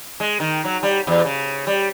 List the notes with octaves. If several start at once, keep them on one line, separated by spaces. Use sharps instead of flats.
G#3
D#3
F#3
G3
E2
C#3
G3